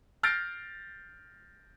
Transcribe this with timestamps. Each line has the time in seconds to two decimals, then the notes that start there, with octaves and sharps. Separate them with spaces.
0.23 F6 G6 A6 A#6 C7 D7